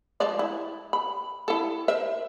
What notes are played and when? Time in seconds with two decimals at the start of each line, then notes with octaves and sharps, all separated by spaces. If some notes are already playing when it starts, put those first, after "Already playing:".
0.20 F3 G#3 D5
0.39 E4
0.93 B5
1.48 E4 A4
1.88 A#4 C5 E5